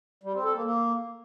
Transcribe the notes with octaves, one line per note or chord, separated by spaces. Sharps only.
G3
C4
A4
A#3
A#3